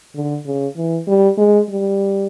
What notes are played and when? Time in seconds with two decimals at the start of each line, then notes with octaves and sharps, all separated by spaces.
0.15 D3
0.46 C#3
0.77 E3
1.07 G3
1.38 G#3
1.70 G3